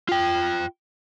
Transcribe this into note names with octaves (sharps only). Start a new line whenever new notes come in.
F4 G5